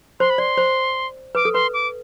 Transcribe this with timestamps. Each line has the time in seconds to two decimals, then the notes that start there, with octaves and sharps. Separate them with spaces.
0.20 C5 C6
0.30 B5
0.38 D5 C6
0.58 C5
1.35 B4 D6
1.45 A4
1.54 B4 C6
1.74 D6